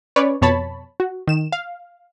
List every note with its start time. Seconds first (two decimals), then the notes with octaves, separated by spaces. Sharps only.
0.16 C#4 B4 C#5 D5
0.42 F2 B2 C#5 A5 B5
1.00 F#4
1.27 D#3 E7
1.52 F5